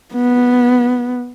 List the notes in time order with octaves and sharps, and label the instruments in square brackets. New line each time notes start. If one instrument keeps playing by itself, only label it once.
[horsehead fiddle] B3